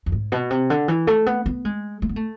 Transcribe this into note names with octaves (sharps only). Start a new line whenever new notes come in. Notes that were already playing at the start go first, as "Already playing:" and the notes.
F2
G#2
B2
C3
D3
E3
A3
B3
B3
G#3
A3
B3
A3